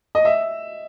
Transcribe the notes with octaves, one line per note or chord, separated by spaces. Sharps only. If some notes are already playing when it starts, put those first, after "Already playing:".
D#5
E5